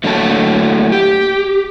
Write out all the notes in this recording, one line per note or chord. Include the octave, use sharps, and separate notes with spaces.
A2 D3 F#3 A3 A#3 A5
G4